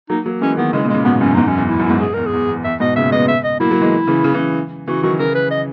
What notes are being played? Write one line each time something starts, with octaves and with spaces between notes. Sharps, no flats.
F#3 A#3 D#4
F#3 A#3
E3 G#3 C#4
D#3 F#3 B3
C#3 E3 G#3
A#2 C#3
G#3
A#2 C#3
G#2 B2 B3
F#2 C#4
E2 G#2 D#4
F#2 C#4
E2
E4
F#2
E4
E2 G#2
G#4
E2 A#4
G#4
E2
E2
E2 E5
G#2 B2 D#5
A#2 C#3 E5
G#3 B3 D#5
E5
D#5
F#3 A#3 E4
F#3 A#3
E3 G#3
C#3 E3
C#3 E3
C#3 E3
C#3 E3 F#4
D#3 F#3 F#4
C#3 E3 A#4
B4
D#5